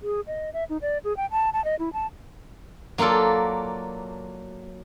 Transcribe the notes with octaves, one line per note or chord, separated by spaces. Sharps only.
G#4
D#5
E5
D#4
D5
G#4
G5
A5
A5
D#5
E4
A5
F#3 A#3 F4 A4 D5